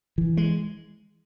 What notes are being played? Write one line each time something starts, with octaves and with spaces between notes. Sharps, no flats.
E3
G#3